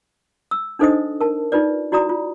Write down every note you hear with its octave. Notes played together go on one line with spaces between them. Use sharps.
E6
D4 D#4 A4 C5 D#5 D#6
A#4 A5
D#4 F4 B4 D5
E4 F#4 D5 A#5 D#6
F4